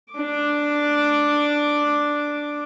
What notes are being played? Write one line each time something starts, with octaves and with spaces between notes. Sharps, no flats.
D4 D6